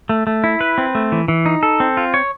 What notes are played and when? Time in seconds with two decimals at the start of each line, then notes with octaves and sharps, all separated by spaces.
0.09 A3
0.27 A3
0.44 E4
0.61 B4
0.78 C4
0.95 A3
1.12 E3
1.28 E3
1.46 D#4
1.63 A4
1.80 C4
1.97 F4
2.14 C#5